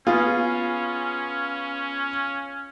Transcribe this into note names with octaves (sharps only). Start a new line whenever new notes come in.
B3 C#4 F4 G#4